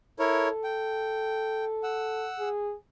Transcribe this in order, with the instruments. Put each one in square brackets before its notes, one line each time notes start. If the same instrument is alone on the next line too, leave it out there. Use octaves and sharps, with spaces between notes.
[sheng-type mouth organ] E4 A#4 C#5 [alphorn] A4
[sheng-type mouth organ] G5
F#5 E6
[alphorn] G#4